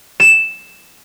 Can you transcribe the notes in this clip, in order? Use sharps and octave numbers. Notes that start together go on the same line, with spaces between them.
E7